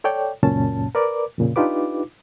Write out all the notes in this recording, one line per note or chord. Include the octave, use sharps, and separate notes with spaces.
A4 C#5 D5 G5
C#2 F#2 A#2 C#4 A5
A#4 B4 D5 D6
F2 A#2 C#3
D4 D#4 F4 G4 B4 D6